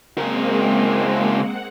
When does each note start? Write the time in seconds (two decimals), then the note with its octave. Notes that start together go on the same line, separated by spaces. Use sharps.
0.18 C#3 G#3 A#3 C4 A#4
1.37 F#5